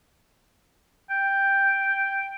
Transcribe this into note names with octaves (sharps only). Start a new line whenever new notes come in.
G5